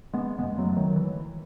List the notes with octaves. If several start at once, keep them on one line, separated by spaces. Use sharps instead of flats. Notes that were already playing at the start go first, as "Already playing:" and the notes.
G#3 B3
F#2 C#3 G#3 B3
F#3 A3
D#3 F#3
E3